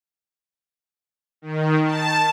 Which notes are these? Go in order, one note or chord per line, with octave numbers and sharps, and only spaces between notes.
D#3
A5